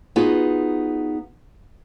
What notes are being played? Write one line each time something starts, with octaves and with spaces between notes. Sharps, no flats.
B3 D#4 F4 F#4 G#4